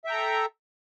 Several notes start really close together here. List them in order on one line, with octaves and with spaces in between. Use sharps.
E5 G5 A#5 A4